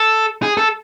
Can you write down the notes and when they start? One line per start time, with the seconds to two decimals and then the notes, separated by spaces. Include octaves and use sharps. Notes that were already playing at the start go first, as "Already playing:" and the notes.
Already playing: A4
0.43 G#4
0.57 A4